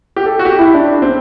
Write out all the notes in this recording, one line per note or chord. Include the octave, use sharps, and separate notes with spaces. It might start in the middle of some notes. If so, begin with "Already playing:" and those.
G4
A4
F#4
G4
E4
D4
C4